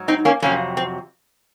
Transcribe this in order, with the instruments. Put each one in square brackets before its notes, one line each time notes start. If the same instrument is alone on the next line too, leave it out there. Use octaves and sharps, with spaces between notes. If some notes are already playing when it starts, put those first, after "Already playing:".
Already playing: [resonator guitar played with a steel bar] G#2 F#3
C4 D#4
A#3 C#4
F2 C3 F#3 A#3 C#4
C4